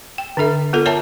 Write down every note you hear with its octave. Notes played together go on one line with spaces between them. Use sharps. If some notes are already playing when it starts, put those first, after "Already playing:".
G5
D3 D4 A4 E5
B3 F4 A4 A#4
A#4 C#5 E5 G5 A5 A#5